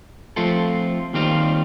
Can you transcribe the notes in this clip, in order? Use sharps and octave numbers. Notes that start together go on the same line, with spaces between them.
F3 A3 C4 F4 A4
D#2 D#3 G3 C4 F4